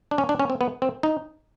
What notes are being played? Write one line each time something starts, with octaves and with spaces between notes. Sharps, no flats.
D4
C#4
D4
C#4
C4
B3
C4
D#4